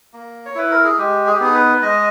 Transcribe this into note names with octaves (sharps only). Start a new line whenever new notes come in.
A#3
C#5
E4 B4
A#4
G#4
G#3 G4
G#4
G4
B3 D#4 G#4
B4
G#3 D#5